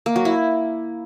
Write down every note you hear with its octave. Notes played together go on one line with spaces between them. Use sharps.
A#3
F#3
E4